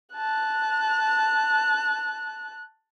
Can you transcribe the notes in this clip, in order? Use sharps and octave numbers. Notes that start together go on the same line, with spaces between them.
A5 F#6